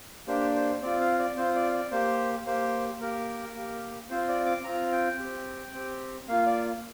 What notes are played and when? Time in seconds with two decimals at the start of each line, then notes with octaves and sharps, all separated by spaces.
0.28 A#3 D4 G4 C5
0.56 C5
0.82 C4 F4 D5
1.00 F5
1.19 D5
1.37 C4 F4 C5
1.55 D5
1.69 F5
1.73 D5
1.91 A#3 G4 C5
2.46 A#3 G4 C5
3.00 A#3 G4 A#4
3.55 A#3 G4
4.10 C4 F4 C5
4.28 D5
4.46 D6
4.64 C4 F4 A#5
4.92 G5
5.19 C4 G4
5.74 C4 G4
6.28 A#3 F4 F5
6.46 D5